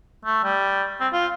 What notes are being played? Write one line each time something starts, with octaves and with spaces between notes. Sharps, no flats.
A3
G3
C4
F4